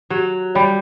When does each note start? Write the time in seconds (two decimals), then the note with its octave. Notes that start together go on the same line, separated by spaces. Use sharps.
0.10 F#3 G4
0.55 G3 C#5 G5 B5